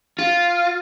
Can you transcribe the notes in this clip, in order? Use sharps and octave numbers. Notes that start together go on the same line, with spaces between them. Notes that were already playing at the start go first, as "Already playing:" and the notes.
F4